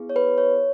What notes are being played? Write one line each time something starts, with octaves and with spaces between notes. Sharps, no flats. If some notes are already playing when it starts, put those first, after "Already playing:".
Already playing: B3 E4 G#4
C#5
B4
C#5